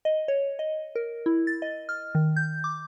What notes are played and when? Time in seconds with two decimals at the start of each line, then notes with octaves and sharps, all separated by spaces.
0.05 D#5
0.28 C#5
0.59 D#5
0.95 A#4
1.26 E4
1.47 A6
1.62 D#5
1.89 F6
2.15 D#3
2.36 G6
2.64 D6